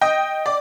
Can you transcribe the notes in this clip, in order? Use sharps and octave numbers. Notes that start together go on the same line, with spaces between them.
D#5 G5
D5